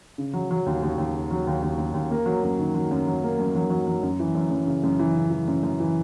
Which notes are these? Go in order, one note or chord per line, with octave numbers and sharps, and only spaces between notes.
C#3
F#3
F#3
D#2
D#2
D#2
C#3
F#3
D#2
D#2
D#2
D#2
A#3
F#3
F#2
D#3
F#3
F#2
F#3
A#3
F#2
F#3
F#3
F#3
F#2
E3
F#2
F#2
C#3
F#2
E3
C#3
E3
F#2
F#2
E3